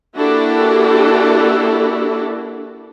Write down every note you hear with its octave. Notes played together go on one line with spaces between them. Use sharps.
A#3 D4 E4 F#4 G4 A4